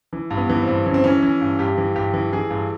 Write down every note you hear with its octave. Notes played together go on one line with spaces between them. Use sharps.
E3
G2
B3
E3
C4
G2
E3 C#4
C4
E3 C#4
E3
G2
G2 G4
E3
G2 G4
E3
E3 G#4
G2